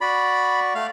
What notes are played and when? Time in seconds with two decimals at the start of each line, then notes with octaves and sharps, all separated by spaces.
0.01 F#4 D5 B5
0.75 A3 F5